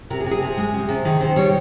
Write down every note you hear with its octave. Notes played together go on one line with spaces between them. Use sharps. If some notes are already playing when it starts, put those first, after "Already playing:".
C3 A#4
G#4
C3
G#4
C3
G#3
C3
C3
D#3 G#4
D#3 C5
G3 C#5